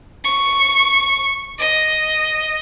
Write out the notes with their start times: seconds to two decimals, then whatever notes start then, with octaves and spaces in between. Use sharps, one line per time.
0.24 C#6
1.59 D#5